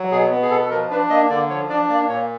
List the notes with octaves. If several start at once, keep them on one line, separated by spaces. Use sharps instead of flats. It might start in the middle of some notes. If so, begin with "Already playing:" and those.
Already playing: F#3
B2 G#4
B3
G#4
B2 A4
A4
F3 A#4
D4 B4
A#3 D#5
D3 D5
F3 C#5
D4 D5
A#3 D5
A#2 C#5